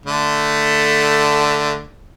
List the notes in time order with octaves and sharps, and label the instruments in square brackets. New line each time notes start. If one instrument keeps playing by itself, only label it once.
[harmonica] D3 A3